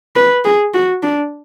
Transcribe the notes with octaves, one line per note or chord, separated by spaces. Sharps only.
B4
G#4
F#4
D4